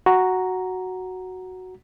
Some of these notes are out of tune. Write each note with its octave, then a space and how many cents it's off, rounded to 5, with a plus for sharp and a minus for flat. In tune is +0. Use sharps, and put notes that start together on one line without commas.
F#4 +0 A#5 +0